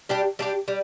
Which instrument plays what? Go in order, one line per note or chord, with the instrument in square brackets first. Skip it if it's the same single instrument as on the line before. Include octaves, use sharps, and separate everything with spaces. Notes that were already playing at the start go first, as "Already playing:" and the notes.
[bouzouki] G3 D4 G4
G3 D4 G4
G3